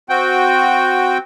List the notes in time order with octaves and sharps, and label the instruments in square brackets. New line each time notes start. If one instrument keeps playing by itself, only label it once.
[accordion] C4 F#4 G5